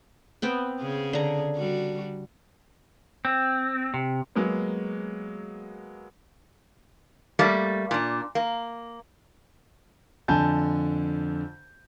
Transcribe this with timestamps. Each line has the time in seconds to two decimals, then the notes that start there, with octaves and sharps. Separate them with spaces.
0.42 B3 C4 G5
0.82 C#3 G#4
1.13 D3 A#5
1.57 G3 F#4
3.25 C4
3.94 C3
4.35 F#3 G#3 A#3 B3
7.39 G3 A3 A#3
7.91 A#2 D4
8.35 A#3
10.28 F2 D3 G#5 A5 G6